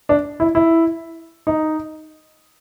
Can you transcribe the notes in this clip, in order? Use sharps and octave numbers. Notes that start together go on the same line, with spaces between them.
D4
E4
E4
D#4